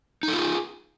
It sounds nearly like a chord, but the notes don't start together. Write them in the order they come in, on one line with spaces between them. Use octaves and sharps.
D#4 A4 F4 G#4